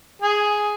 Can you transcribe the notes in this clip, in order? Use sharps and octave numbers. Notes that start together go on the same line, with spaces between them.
G#4